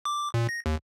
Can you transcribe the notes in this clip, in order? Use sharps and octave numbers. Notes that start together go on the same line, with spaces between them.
D6
A#2
A#6
D#2